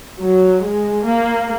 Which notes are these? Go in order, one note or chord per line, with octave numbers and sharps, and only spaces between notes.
F#3
G#3
A#3